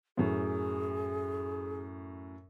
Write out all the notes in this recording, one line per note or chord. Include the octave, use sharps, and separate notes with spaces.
F#2 A2 G#4